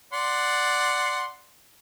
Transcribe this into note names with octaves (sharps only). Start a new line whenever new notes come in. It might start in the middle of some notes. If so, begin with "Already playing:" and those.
D5 F#5 C6